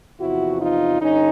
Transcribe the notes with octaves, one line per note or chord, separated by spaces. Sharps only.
E2 C3 F3 E4 F#4
D#4 F4
G2 D3 C#4 D#4